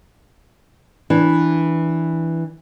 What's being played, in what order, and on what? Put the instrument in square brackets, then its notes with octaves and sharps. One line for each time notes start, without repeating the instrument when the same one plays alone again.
[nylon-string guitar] E3 D4